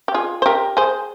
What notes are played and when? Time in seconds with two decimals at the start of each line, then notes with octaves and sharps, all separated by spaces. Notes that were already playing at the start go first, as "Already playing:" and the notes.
0.08 G4
0.14 F4 G#4
0.42 C5
0.46 G4 A#4
0.77 G#4 C5